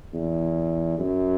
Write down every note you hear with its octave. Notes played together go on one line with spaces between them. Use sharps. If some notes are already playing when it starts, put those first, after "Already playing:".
E2
F#2